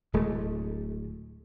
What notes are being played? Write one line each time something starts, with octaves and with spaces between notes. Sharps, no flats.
D1 G#3 A3